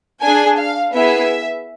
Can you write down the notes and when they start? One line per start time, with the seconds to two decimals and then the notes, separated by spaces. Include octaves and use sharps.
0.22 D4 G#4 G#5
0.58 F5
0.93 B3 E4 G#4 E5